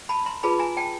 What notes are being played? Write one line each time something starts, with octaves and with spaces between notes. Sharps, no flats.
A5 B5
A#5 C6
F4 G#4 B4 A5 B5
G#5 A#5
G5 A5